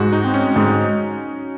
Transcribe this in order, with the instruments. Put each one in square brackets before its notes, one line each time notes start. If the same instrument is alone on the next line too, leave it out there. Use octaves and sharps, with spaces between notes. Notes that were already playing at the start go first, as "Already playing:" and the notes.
Already playing: [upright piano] G#2 [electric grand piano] F#4
[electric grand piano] D#4
[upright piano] C4
[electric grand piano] C#4
[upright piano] G#2